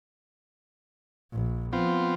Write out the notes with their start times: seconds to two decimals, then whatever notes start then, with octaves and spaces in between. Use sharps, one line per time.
1.32 A#1
1.73 F3 B3 C4 F4